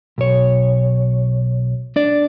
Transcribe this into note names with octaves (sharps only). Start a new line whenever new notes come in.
B1 C#5
D4 D5